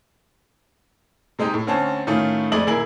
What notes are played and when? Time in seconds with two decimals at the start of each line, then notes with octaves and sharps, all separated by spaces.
1.39 C3 G#3 D#4 G4
1.54 A2
1.67 D2 C4 C#4 A5
2.07 A2 D#3 A3 C#4 F4
2.52 F2 G#3 A3 D5 D#5 F#7
2.67 D#1 E4 G#4 A#4 F#7